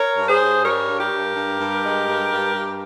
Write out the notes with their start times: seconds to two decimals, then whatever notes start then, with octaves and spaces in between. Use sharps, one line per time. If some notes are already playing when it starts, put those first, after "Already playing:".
Already playing: A#4 C#5
0.17 G2
0.29 G#4 C5
0.42 G2
0.65 G3 A#4 C#5
0.89 G2
1.00 G4 A#4
1.12 G2
1.36 G2
1.59 G2
1.83 G#3
2.08 G2
2.31 G2
2.55 G2